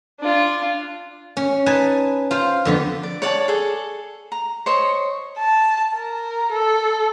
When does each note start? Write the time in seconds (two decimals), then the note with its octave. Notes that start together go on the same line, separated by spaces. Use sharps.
0.20 D4 F4
1.37 C#4
1.66 D#4 B4 G#5 A5
2.31 F4 C5 F5
2.65 F2 D3 B3
3.03 D5
3.22 C#5 D5 G#5 A5
3.48 G#4 A4
4.32 A#5
4.66 C5 C#5 D#5 C#6
5.39 A5
5.96 A#4
6.52 A4